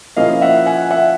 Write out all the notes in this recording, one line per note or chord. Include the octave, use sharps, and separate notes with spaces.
A#2 F3 A#3 C#4 E4 D#5 F5
E5 F#5
F#5 G#5
E5 F#5